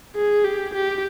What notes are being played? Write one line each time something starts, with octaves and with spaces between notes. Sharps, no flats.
G#4
G4
G4